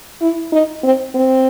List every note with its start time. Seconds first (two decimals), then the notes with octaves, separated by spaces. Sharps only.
0.21 E4
0.53 D#4
0.83 C4
1.15 C4